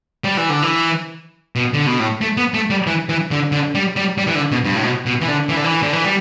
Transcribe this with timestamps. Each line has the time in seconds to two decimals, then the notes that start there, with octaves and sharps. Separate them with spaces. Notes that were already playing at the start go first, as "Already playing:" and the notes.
0.24 G3
0.37 E3
0.50 D3
0.62 E3
1.56 B2
1.73 D3
1.87 B2
1.99 A2
2.21 A3
2.37 B3
2.54 A3
2.70 G3
2.87 E3
3.09 E3
3.31 D3
3.52 D3
3.75 G3
3.96 G3
4.18 G3
4.27 E3
4.35 D3
4.52 B2
4.65 G2
4.75 A2
4.83 B2
5.06 B2
5.22 E3
5.28 D3
5.49 E3
5.57 D3
5.64 E3
5.83 D3
5.93 E3
6.04 G3